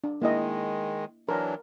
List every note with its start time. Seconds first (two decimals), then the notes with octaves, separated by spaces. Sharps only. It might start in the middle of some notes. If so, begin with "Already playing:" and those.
0.04 D4
0.22 D#3 G#3 A#3 E4 D#5
1.29 E3 F#3 D4 A#4